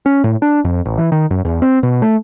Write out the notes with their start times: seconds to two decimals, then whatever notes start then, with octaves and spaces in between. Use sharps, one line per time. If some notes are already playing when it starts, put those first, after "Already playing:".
0.06 C#4
0.24 A2
0.42 D4
0.65 F2
0.85 A1
0.98 E3
1.12 D#3
1.31 F#2
1.45 E2
1.62 C4
1.83 B2
2.02 A3